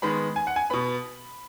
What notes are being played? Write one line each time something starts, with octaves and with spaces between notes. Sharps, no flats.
D#3 G#3 B3 B5
G#5
F#5
G#5
B2 B3 B5